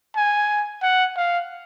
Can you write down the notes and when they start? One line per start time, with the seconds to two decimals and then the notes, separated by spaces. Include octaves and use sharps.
0.16 G#5
0.82 F#5
1.16 F5